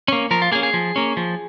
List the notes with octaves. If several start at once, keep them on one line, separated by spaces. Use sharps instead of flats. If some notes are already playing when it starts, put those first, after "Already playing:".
A#3 C#4
F3 A#4
F4
A#3 C#4 G#4
G#4
F3
A#3 C#4
F3